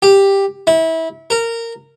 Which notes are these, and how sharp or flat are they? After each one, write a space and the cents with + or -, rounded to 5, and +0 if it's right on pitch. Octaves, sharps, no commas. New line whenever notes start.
G4 +5
E4 -25
A#4 -15